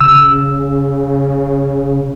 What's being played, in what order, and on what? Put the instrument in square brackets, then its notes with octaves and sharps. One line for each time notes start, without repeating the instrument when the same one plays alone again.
[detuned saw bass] C#3 [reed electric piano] E6